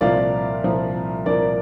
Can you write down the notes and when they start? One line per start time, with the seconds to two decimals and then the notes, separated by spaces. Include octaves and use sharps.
0.01 C2 A#2 F3 D5 F5
0.64 C2 A#2 F3
1.26 C2 A#2 F3 A#4 D5